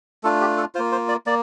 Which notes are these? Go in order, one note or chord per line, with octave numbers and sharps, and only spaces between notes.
A3 D4 F4 A4
G4
A4
A#3 F4 C5
C5
D5
A#3 D5